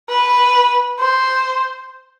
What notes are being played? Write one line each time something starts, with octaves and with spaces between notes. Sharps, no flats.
B4
C5